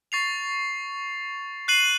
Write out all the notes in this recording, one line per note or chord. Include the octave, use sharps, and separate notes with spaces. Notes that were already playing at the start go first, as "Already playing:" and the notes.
C#6 A6 C7 F7
F#6 C7 D#7 F#7